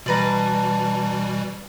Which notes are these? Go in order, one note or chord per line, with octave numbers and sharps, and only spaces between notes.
B2 E3 G3 D4 B4 A#5